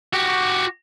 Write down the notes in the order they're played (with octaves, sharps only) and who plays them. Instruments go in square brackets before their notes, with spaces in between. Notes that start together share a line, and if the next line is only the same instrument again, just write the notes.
[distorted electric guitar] F#4 G4